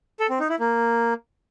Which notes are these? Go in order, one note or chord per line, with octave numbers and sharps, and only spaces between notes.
A4
C4
D#4
E4
A#3